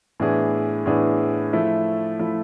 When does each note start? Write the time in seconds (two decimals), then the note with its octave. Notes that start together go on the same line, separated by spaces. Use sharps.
0.20 A2 E3 B3 D4 G#4
0.86 A2 E3 B3 D4 G#4
1.53 F3 A3 E4
2.19 F3 A3 E4